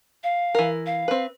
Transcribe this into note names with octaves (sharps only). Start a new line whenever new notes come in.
F5
E3 A#4
F5
C4 B4